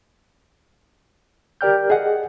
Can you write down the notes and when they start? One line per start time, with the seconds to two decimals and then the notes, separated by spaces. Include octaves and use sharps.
1.61 G4 A#4 D5 G5 F6 G6
1.90 G#4 D#5 F#5